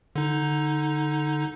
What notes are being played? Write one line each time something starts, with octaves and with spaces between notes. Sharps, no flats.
D3 D#4